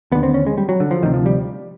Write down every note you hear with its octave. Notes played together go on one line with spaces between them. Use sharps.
D#2 D3 B3
C4
C#4
G#3
G3
F#3
D3
F3
D2 C3 D#3
F3
G3